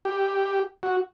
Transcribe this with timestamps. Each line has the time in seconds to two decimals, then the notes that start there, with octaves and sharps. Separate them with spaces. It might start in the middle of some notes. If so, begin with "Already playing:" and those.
0.05 G4
0.83 F#4